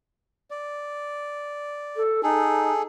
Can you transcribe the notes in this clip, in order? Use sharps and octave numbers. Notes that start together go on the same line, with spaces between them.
D5
A4
D#4 G#4 A4